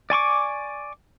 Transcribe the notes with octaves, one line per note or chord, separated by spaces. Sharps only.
D5 G#5 C#6 D6